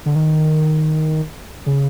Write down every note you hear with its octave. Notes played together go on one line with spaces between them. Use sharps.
D3
D#3
C#3